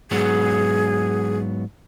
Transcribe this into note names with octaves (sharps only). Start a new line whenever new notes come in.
G#2 F#3 B3 G#4